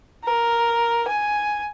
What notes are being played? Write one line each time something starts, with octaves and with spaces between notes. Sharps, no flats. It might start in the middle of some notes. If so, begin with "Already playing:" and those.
A#4
G#5